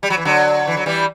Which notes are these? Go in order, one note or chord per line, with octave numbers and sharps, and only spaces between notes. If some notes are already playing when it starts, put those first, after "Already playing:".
G3
F#3
E3
D3 F#3
E3
F#3
E3 G3